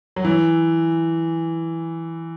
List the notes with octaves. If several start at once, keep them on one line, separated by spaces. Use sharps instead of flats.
F#3
E3